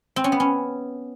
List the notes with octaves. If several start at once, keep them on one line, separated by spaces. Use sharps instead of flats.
C4
C#4
B3
C#4